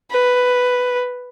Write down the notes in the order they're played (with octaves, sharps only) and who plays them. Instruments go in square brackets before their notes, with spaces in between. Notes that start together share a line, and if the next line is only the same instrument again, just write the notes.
[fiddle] B4